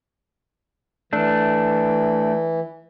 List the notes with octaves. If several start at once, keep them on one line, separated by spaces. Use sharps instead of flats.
E3 A3 D4